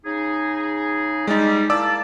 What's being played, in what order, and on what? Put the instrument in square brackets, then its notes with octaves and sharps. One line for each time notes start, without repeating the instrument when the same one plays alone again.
[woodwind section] C#3 D#4 G#4
[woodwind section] G3 [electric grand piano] G#3 D#4
[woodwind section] A#3 E4 A5 [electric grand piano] D5 D6 E6